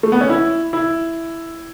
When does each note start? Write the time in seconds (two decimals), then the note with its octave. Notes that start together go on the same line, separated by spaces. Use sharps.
0.03 A3
0.12 B3
0.21 C#4
0.30 E4
0.73 E4